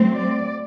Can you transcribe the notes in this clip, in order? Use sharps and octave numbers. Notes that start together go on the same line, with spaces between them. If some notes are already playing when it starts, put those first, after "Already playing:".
Already playing: F#3 A3 C4
D5